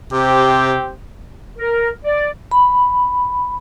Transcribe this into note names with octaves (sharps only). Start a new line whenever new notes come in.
C3 C4 G4
A#4
D5
B5